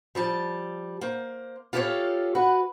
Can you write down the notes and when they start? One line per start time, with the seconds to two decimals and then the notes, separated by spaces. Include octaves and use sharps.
0.15 F3 G3 A5
1.01 A#3 C5
1.73 F4 G4 A4 B4 C#5 F5
2.35 F#4 B4